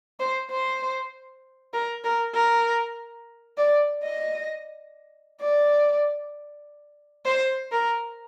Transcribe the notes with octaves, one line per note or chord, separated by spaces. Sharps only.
C5
C5
A#4
A#4
A#4
D5
D#5
D5
C5
A#4